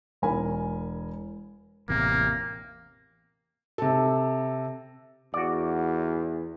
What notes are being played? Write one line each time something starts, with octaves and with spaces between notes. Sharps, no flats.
E1 A#4 G#5 B5
A1 E2 C3 A#3
C3 A4
E2 F#4 D5